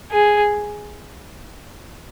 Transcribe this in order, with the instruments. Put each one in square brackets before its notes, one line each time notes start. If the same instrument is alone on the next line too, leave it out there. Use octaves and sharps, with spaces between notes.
[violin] G#4